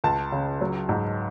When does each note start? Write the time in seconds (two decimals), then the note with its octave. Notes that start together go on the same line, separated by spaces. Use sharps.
0.04 C#2 A5
0.32 C#3
0.61 F#3
0.89 G#2